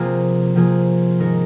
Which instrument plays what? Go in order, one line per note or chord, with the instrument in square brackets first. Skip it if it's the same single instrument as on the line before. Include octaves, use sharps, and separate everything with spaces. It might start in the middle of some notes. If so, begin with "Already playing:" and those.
Already playing: [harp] C3 F3 A#3 F4 G#4
C3 F3 A#3 F4 G#4
G#2 D#3 G#3 D#4 A#4